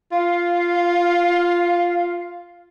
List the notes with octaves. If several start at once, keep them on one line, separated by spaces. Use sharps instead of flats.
F4 F5